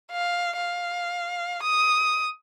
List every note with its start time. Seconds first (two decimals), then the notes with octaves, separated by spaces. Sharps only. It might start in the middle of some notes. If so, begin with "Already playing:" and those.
0.11 F5
0.56 F5
1.63 D#6